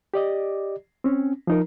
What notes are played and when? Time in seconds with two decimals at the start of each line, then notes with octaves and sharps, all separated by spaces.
0.14 G4 D5 D#5
1.04 C4 C#4
1.47 F3 D#4 A#4